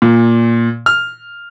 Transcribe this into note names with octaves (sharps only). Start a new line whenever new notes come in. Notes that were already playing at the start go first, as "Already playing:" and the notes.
A#2
F6